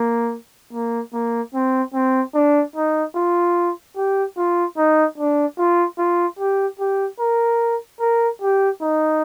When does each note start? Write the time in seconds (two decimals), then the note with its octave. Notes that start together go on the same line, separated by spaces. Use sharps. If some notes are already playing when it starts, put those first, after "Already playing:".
Already playing: A#3
0.73 A#3
1.13 A#3
1.54 C4
1.94 C4
2.35 D4
2.76 D#4
3.16 F4
3.97 G4
4.38 F4
4.77 D#4
5.18 D4
5.58 F4
5.98 F4
6.39 G4
6.79 G4
7.20 A#4
8.00 A#4
8.42 G4
8.82 D#4